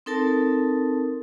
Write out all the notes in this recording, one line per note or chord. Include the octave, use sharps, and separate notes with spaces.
C4 D#4 A4 A#4 A5